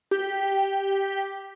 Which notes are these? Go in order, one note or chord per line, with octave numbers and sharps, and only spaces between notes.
G4